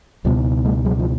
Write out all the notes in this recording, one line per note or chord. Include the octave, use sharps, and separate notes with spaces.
C#2 B2 F3 G3
G3 A3
F#3 G#3
F3